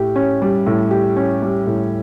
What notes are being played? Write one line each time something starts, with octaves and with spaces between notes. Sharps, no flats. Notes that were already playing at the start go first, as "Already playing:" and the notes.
Already playing: A2 G4
C#4
G3
A2
G4
C#4
G3
A2